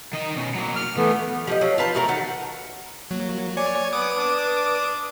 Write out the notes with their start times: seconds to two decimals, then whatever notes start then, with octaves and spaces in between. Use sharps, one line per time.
0.13 D#3 D#5
0.36 B2 C#4
0.55 F#3 A#3
0.76 F6
0.97 E3 A3 B3
1.47 F3 G3 D#5
1.61 F3 F#3
1.78 F4 B4 A5
1.95 A3 F#4 A#4
2.08 D#3 A4 F#5
3.11 F#3 A#3
3.57 C#5 D5 G#5
3.93 B3 B4 D6 D#6
4.16 D4